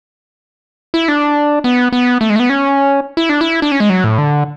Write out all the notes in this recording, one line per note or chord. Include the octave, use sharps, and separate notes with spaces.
E4
D4
B3
B3
A3
G#3
A3
B3
C#4
E4
D4
E4
D4
C#4
G#3
F#3
A2
D3